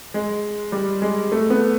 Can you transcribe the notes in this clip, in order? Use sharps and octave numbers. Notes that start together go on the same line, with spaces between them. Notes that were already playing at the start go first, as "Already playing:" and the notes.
G#3
G3
G#3
A3
B3